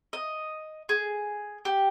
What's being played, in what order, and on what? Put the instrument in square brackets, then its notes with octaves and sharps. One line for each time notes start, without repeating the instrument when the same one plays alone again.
[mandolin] D#5
G#4
G4